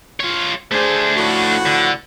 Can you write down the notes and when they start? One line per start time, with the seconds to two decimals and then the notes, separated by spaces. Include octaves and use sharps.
0.20 F4 C#5
0.72 A3 D4 G#4 C5
1.16 A2 F3 F#4
1.66 D3